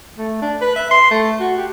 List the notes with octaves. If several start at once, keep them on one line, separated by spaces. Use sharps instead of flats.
A3
D4
B4
E5
C6
A3
F#4
G4